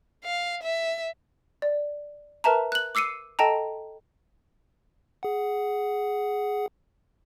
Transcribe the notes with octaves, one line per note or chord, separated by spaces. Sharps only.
F5
E5
D5
A#4 B4 E5 A5 A#5
F#6 F#7
D6 E6 C7 C#7 D#7
A4 D#5 G5 A5 A#5
G#4 F#5